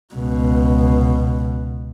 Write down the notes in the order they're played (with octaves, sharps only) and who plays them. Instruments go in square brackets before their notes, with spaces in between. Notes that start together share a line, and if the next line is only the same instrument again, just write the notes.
[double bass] C#2 B2